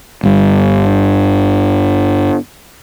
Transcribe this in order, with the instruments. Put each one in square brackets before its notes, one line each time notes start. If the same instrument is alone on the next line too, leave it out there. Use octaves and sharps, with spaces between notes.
[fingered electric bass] G1 G2